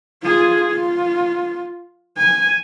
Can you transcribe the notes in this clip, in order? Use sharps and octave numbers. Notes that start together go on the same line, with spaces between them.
F4 G#4
F4
G#5